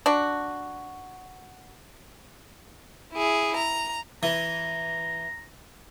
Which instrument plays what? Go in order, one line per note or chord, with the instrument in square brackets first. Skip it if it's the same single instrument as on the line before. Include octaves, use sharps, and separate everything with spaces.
[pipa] D4 F#4
[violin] E4 G#4
A#5
[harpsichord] E3 [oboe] A#5